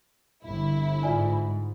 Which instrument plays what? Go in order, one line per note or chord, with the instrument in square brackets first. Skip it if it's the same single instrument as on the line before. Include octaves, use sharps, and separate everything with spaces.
[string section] G1 E4
[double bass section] G#2 [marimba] F4 D5 G#5